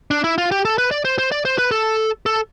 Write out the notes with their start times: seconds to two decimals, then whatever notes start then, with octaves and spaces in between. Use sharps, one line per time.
0.11 D4
0.24 E4
0.38 F4
0.51 G4
0.65 A4
0.78 B4
0.91 D5
1.05 C5
1.18 C5
1.32 D5
1.45 C5
1.58 B4
1.71 A4
2.26 A4